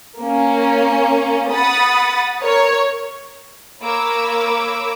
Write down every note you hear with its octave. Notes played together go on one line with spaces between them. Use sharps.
A#3 C#4
F#5 B5 D#6 A6
A#4 C#5
A#3 A#4 C#5 B5 D6 E6